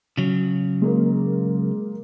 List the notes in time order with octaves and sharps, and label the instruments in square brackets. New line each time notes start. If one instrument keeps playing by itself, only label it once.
[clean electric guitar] C#3 F#3
[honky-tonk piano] G#3 A#3 A#4